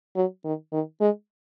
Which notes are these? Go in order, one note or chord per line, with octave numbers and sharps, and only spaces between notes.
F#3
D#3
D#3
G#3